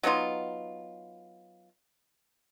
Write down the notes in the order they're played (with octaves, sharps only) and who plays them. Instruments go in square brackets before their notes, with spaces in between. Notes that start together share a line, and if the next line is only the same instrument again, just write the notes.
[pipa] F#3 B3 D#4 F4